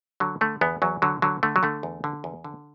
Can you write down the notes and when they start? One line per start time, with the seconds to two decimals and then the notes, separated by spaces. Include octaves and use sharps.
0.20 D3 F#3
0.41 D3 A3
0.61 E2 B3
0.82 E2 F#3
1.02 D3 F#3
1.22 D3 F#3
1.43 D3 A3
1.56 F#3
1.63 D3 A3
1.83 E2
2.04 D3
2.24 E2
2.44 D3